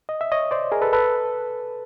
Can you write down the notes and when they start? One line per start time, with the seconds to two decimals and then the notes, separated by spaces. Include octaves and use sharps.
0.09 D#5
0.21 E5
0.32 C#5 D#5
0.51 C5 D5
0.72 G#4 A#4
0.82 A4 B4
0.93 A4 B4